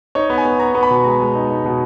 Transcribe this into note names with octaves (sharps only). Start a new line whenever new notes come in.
D#4 C#5
B3
G#5
B3
B3 A#5
B3
B5
B2
G#3 A#5
G#3
D#4
D#4
B2